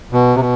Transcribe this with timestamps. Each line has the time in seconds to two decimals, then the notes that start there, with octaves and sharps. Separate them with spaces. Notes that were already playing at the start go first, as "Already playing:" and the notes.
0.12 B2
0.36 C3
0.40 B2